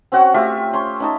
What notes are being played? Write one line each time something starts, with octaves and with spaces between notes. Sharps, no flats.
C4 C#4 F#4 F#5
A3 F4 G4 E5
C#4 C6
C#4 D#4 A5